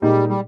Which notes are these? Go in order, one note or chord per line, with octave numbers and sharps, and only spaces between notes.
A#2 G3 G#3 D#4 G4
G3